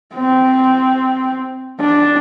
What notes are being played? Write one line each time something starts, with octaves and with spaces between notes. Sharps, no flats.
C4
D4